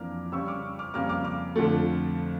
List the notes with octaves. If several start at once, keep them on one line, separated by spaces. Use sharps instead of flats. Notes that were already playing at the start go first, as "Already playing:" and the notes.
Already playing: F2 E3 A#3 D4 D6 F6
C#3 G3 C#4 C#6 E6
D6 F6
D6 F6
F2 C#3 G3 A#3 D6 F6
D6 F6
D6 F6
F2 D3 F3 A3